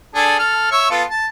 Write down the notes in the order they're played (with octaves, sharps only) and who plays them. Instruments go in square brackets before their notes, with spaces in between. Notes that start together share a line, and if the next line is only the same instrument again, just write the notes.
[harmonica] D4 G#4 A4
A4 F6
C#5 E5 C#6
B3 F4 A4
A5